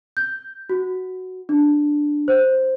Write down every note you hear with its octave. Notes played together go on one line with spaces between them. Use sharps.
G6
F#4
D4
C5